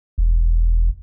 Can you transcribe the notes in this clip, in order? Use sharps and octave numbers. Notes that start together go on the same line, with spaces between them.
E1